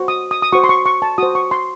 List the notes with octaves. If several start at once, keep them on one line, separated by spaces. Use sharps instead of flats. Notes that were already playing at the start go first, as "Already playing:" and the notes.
Already playing: F#4 C5
D#6
D#6
D#6
F#4 C5 C#6
C6
C#6
C#6
A5
F#4 C5 D#6
C#6
C6